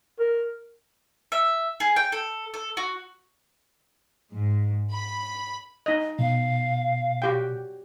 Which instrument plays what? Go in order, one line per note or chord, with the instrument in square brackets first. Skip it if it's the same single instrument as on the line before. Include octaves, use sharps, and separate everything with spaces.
[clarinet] A#4
[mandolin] E5
G#4
G5
A4
A4
F#4
[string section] G#2
B5
[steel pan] D#4 D#5
[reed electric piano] B2 [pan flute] F5
[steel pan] F#4 G4 G5